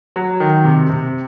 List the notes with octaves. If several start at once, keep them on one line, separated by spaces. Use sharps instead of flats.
F#3
D#3
C3
C3